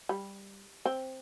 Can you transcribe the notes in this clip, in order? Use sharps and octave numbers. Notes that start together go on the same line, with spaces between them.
G3
C4